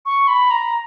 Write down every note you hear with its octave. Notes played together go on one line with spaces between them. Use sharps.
C#6
B5
A#5